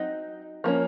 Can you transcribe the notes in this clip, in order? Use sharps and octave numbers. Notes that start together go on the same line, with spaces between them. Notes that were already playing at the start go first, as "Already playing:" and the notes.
Already playing: F#3 C4 D#4 D#5
F3 A#3 C#4